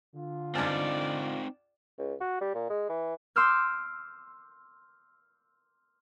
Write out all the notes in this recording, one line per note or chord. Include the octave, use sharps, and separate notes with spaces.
D3 F4
C#2 G2 C4 D#4 D5
C#2
F#4
G3
A#2
G#3
E3
C6 D6 E6 F6 G6